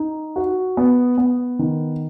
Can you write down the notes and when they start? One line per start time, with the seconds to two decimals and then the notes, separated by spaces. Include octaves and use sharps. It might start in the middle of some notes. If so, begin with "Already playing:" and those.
Already playing: D#4
0.36 F#4
0.77 B3
1.18 B3
1.59 D#3